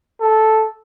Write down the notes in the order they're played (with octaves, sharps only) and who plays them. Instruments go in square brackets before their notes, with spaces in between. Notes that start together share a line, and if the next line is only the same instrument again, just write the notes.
[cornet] A4